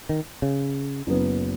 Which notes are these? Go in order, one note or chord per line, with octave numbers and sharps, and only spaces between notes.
D#3
C#3
F#1 F#2 F#3 B3